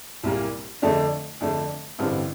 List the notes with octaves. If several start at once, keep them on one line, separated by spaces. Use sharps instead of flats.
C2 A#2 G3 A#3
F2 D3 A3 D4
F2 D3 A3 D4
A1 G2 D3 G3 C4